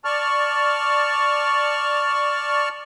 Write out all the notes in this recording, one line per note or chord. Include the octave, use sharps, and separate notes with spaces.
D5 A5 C#6 F6